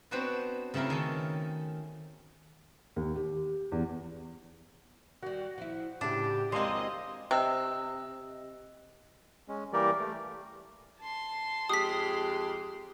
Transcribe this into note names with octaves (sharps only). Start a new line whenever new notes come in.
B3 C4 D4 F#4 B4 C5
C#3 A3 C4 E4 A#4
D#3 C#4 A4
D#2
G4
E2
D#3 G3 F#4
F3 E4
A2 C#3 D4 E4 G4
F2 D#3 G#3 A#3 C4 D5 D#5 C6
C3 D#5 E6 F#6
G#3 C#4
E3 G3 A#3 G4 A#4 D5
A3
A5 C6
F2 G#3 G4 D#6 B6